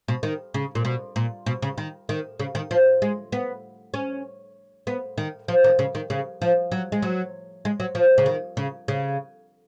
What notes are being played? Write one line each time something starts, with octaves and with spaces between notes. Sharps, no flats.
B2
D#3
C#3
A#2
B2
A#2
B2
C#3
D#3
D#3
C#3
D#3
F3
G#3
B3
C#4
B3
D#3
F3
D#3
C#3
D#3
C#3
F3
F#3
G#3
F#3
G#3
F#3
F3
C#3
D#3
C#3
C#3